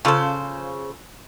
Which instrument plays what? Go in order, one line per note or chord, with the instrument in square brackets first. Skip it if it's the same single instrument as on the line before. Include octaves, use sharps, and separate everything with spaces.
[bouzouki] C#3 C5 [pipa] F3 F4 A4